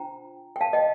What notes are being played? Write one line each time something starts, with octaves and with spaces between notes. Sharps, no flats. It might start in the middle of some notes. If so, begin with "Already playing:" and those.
Already playing: D4 F4 C5 G5 A#5
G5
F5 A5
D#5 G5